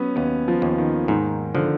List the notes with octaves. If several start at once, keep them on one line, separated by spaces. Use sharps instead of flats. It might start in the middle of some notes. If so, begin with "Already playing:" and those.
Already playing: F#3 B3 C#4
D#2 B3
F3
D#2
D#3
G#2 D#3
D3 F3